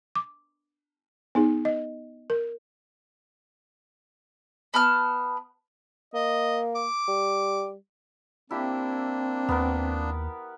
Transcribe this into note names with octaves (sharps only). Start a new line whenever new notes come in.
D6
B3 D#4 G#4
D#5
A#4
B3 A5 F6
A#3 D#5
D6
G3
A#3 C4 D4 E4 G4
D#2 B3 A#4